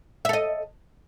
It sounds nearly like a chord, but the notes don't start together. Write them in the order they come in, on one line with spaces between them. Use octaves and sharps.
E5 A4 D#5